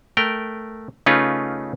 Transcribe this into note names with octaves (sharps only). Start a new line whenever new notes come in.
A3 A#4 G5
C#3 A3 C#4 D#4 F4 B4